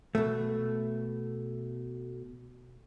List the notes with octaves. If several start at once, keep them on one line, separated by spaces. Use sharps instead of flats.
B2 A3